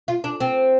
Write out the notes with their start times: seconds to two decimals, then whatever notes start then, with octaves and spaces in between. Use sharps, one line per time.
0.08 F4
0.24 D4
0.40 C4